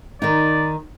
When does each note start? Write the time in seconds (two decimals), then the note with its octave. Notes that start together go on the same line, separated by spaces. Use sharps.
0.22 D#3 D#4 D5